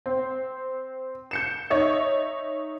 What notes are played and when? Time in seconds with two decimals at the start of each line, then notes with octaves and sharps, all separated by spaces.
0.06 C4
1.31 G6 C#7 E7
1.70 D#4 C#5 D#5 E5